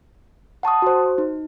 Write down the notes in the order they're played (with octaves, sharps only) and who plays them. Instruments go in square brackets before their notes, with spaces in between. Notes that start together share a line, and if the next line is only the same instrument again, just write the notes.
[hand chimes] F#5 A5 C#6 D#6
F#4 C5
D#4